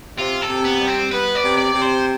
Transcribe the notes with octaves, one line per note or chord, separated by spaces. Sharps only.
C3 F4
A4
C3
B3
G3
C4
B3 B4
D5
C3
D5
C3
C5